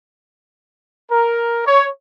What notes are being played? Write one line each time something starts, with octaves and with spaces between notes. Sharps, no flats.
A#4
C#5